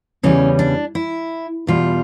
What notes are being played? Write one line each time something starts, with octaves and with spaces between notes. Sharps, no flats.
E2 C#3 E3 G3 C#4
D4
E4
E2 B2 G3 F4